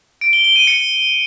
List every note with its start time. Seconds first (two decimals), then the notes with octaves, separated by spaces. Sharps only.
0.21 D7
0.33 G7
0.44 G7
0.56 D#7
0.67 C#7